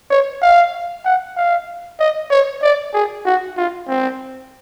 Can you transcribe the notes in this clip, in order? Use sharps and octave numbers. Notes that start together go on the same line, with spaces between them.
C#5
F5
F#5
F5
D#5
C#5
D5
G#4
F#4
F4
C4